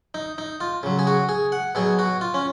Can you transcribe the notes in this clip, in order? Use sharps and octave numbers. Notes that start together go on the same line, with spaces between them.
D#4
D#4
F4
C#3 F#3
G#4
F#4
G#4
F#5
B2 F#3 G#4
F#4
F4
C#4